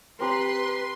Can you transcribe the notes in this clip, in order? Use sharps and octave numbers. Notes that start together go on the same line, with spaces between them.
C4 G4 B4 A#5 C6